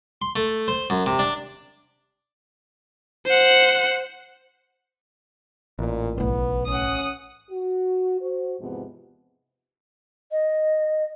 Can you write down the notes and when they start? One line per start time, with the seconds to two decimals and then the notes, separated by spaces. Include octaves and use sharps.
0.22 C6
0.36 A3
0.68 C5
0.90 F#2
1.06 C3
1.19 D4
3.26 C5 F#5
5.79 A1 A#2
6.18 B1 A2 B3
6.68 C#4 F#5 D#6
7.51 F#4
8.21 F#4 C5
8.60 E2 G#2 C3 F3 B3
10.31 D#5